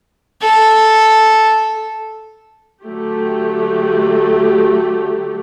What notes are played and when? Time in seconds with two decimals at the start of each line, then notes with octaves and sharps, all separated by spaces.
0.42 A4
2.84 D3 F#3 A3 G4